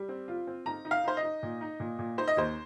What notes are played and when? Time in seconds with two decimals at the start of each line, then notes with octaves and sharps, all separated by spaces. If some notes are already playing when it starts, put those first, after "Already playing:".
Already playing: G3
0.09 C4
0.28 F4
0.47 C4
0.66 D#4 A#5
0.85 D#4
0.91 F5
1.04 D#4 C5
1.17 D#5
1.23 D#4
1.43 A#2
1.61 D#4
1.80 A#2
1.99 A#2
2.18 D#4 C5
2.28 D#5
2.37 D#2 C5